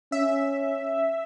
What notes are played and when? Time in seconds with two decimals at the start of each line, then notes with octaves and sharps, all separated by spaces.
0.12 C#4 E5